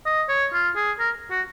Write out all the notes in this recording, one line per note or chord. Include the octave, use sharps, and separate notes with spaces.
D#5
C#5
F4
G#4
A#4
F#4